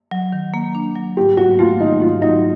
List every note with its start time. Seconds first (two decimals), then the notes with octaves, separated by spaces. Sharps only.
0.11 F#3
0.32 D#3
0.54 A#3
0.75 D4
0.96 F#3
1.17 G#2 G4
1.37 F#3 F#4
1.59 A3 F4
1.80 D#3 D#4
2.00 G#2 F4
2.22 F#3 D#4